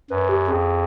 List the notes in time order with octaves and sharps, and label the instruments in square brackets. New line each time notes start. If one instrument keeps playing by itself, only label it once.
[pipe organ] F#2 [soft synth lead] B4
[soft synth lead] G4
[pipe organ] F2 [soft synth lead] G#4